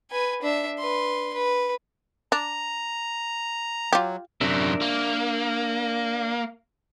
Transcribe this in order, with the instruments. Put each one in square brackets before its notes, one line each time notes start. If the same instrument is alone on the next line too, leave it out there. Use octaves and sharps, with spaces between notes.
[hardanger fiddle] B4 G#5
D4 E5
B4 C6
B4
[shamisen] D4 [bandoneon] A#5
[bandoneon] F#3 [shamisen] F4 G4
[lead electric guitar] F#2 C3 [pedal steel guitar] D4 A#4 E5
[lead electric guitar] A#3